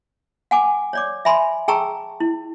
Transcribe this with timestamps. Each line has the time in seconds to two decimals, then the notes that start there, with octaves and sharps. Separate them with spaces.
0.51 F#5 G#5 D6
0.93 C#5 D5 D6
1.25 E5 G#5 B5 C6
1.68 G#4 G5 A5 A#5 C#6 E6
2.20 E4